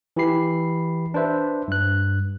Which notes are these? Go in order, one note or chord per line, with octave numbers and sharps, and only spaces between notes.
E3 E4 G4 B5 C7
D4 B4 C5 E5
G2 F#6